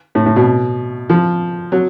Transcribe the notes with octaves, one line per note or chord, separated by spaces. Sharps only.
A2
A2
B2
F3
F#3